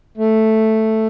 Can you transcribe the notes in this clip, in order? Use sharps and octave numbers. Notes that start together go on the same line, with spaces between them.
A3